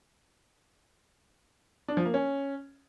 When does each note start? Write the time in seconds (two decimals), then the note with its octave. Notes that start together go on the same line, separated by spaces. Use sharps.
1.88 D4
1.97 F3
2.05 A#3
2.14 C#4